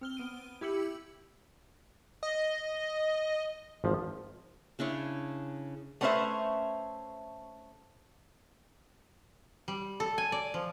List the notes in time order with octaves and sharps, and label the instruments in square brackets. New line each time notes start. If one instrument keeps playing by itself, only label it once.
[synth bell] C4 F6 G7
B3 D7 D#7
E4 G4 E6 C#7 F#7
[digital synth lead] D#5
[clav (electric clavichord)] G#1 F3
[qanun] C#3 D4 E4 C#5
[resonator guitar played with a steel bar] A3 B3 C#4 B4 C5 E5
[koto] G3
A4
G#5
D5
F3